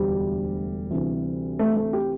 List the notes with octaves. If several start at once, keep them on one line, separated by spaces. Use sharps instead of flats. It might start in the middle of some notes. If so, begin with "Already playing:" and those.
Already playing: E1 D2 D3 G3
D2 C3 E3
A3
A3
G4